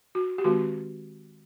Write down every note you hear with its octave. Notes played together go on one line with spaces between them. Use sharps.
F#4
G4
D#3 G#3 C4 F#4